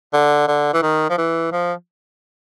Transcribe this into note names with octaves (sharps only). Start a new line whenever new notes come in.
D3
D3
E3
D#3
F3
E3
F3